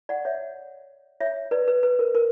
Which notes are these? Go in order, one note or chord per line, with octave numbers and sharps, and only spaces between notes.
D5 F#5
C#5 E5
C#5 E5
B4 D5
B4
B4
A#4
A#4